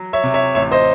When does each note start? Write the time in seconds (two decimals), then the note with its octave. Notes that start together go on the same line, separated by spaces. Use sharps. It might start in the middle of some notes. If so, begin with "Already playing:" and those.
Already playing: F#3
0.13 C#5 E5
0.24 C3
0.34 C#5 E5
0.55 A1 C#5 E5
0.72 C5 D#5